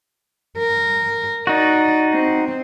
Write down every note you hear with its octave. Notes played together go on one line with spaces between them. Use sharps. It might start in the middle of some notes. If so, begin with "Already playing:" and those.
A#4
D#4 F#4 D5
C4